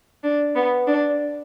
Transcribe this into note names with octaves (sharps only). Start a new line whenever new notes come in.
D4
B3
D4